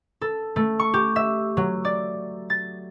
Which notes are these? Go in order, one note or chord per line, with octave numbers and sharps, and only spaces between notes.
A4
A3
C#6
G4
E5
F#3
D5
A6